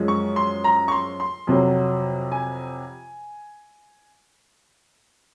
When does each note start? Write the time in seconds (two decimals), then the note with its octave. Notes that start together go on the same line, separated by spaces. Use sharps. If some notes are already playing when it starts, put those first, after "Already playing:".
Already playing: F#2 F3 G#3
0.08 C#6
0.36 C6
0.64 A#5
0.88 C#6
0.92 C6
1.20 C6
1.47 F2 C3 F#3
2.32 G#5